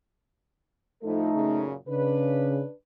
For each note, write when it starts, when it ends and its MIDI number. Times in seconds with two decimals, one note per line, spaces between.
1.04 1.31 45
1.04 1.31 53
1.04 1.64 57
1.04 1.64 63
1.04 1.64 69
1.34 1.74 42
1.34 1.74 46
1.34 1.74 49
1.89 2.62 49
1.89 2.71 62
1.89 2.71 71